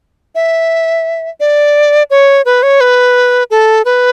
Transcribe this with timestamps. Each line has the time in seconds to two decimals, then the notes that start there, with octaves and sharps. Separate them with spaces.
0.35 E5
1.40 D5
2.10 C#5
2.45 B4
2.63 C#5
2.81 B4
3.51 A4
3.85 B4